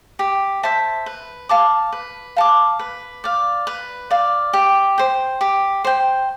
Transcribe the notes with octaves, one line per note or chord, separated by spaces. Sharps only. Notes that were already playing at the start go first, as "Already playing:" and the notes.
G4
C5 E5 A5
B4
F5 A5 D6
B4
F5 A5 D6
B4
D5 F5
B4
D5 F5
G4
C5 G5
G4
C5 G5